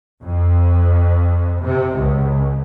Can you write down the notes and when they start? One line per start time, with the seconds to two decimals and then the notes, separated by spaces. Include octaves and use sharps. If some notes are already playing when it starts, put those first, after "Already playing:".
0.21 F2
1.61 C3
1.96 C#2